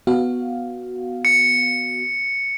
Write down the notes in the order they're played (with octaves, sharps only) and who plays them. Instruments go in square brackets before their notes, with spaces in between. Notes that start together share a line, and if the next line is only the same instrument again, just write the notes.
[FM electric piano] B3 F#4 F5
[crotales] C#7